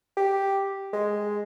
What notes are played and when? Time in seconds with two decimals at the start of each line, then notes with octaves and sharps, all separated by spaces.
0.17 G4
0.93 G#3